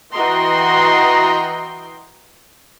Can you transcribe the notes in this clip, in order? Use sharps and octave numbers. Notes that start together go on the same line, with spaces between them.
E3 F#4 D#5 G5 A#5 C6